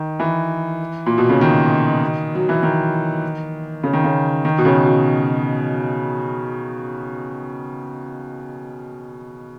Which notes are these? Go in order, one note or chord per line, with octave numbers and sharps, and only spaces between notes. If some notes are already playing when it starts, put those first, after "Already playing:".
Already playing: D#3
E3
A#2
B2
C#3
D#3
F#3
E3
D#3
C#3
D#3
C#3
D#3
B2
C#3
B2